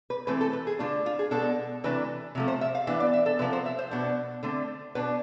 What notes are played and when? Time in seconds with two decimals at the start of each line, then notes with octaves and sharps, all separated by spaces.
0.10 B4
0.27 E3 A3 C4 B4
0.41 A4
0.53 B4
0.67 G#4
0.79 D3 A3 D4 F4
1.06 F4
1.19 G#4
1.31 B2 G#3 B3 D4 A4
1.84 C3 E3 A3 D4 B4
2.35 C3 F3 A3
2.48 C5
2.61 E5
2.75 F5
2.87 E3 B3 D4 E5
3.00 D5
3.13 E5
3.26 A4
3.39 C3 F3 B3 B4
3.53 C5
3.66 E5
3.79 C5
3.91 B2 B3 D4
4.43 D3 A3 C4
4.95 B2 B3 D4 B4